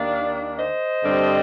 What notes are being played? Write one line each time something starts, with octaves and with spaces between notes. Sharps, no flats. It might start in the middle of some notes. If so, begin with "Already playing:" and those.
Already playing: D#2 D#3 A#3 D4 D5 F5
C5 D#5
G2 D3 G3 C4